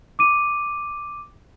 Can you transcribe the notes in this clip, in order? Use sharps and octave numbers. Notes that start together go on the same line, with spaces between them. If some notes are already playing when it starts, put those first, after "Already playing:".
D6 D#7